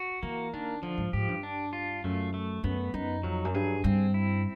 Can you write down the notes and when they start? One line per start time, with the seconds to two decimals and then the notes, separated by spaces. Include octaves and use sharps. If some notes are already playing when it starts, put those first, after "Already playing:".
Already playing: F#4
0.23 E3 A#3
0.53 D#3 D4
0.82 D3 F3
0.98 G#2
1.13 G#2 G4
1.28 G2
1.43 D4
1.73 F4
2.04 F#2 A3
2.34 A3
2.64 F#2 B3
2.94 F#2 D#4
3.23 F2 F#3
3.45 F#2
3.54 G2 G#4
3.84 G2 C4
4.14 E4